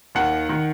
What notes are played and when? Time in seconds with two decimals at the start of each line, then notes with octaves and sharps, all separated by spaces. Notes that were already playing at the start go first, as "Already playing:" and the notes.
0.15 D#2 D#3 F#5
0.49 D#3